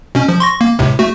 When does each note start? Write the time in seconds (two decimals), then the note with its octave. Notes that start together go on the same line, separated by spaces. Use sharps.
0.15 B2 C#4
0.28 F3
0.40 C6 C#6 A#6
0.61 A#3
0.79 C#2 A2 C3
0.99 A3 F#4